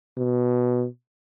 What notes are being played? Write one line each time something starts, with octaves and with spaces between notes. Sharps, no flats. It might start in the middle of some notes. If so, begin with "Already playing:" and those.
B2